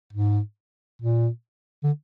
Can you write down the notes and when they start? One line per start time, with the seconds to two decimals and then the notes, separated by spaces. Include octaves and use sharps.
0.13 G#2
1.02 A#2
1.84 D3